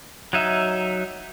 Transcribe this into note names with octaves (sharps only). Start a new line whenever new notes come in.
F#3 D#4 E5